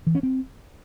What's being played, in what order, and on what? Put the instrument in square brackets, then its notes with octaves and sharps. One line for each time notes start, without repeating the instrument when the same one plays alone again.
[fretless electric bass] E3
C#4
C4